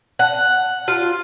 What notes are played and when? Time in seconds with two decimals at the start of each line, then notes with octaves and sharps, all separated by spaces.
0.19 F#5
0.88 F4